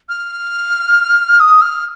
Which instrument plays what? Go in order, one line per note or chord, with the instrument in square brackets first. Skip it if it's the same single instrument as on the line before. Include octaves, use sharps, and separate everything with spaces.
[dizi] F6
D#6
F6